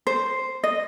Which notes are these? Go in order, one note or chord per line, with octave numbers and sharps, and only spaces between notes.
C5
D#5